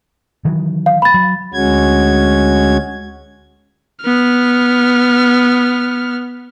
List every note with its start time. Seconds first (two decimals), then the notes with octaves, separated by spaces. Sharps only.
0.45 D#3 E3 F#3
0.86 F5
1.02 B5 A6
1.14 F#3
1.54 D2 G#3 C#4 F#4 G#6
4.03 B3 F6